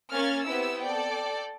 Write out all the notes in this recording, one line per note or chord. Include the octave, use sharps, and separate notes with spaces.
A#3 C#4 F6 G#6 A6
B3 C4 E4 G4 E6
A4 D5 G5